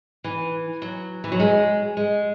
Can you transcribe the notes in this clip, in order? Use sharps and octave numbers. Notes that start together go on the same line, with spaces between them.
E3
F#3
E3
F#3
G#3
G#3